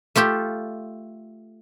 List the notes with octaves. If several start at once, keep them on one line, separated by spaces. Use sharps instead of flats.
A3 F4 G4 A4